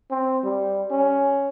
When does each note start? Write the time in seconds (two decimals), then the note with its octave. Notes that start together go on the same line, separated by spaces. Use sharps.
0.10 C4
0.44 G3
0.91 C#4